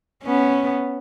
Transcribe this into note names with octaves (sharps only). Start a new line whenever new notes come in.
B3 C#4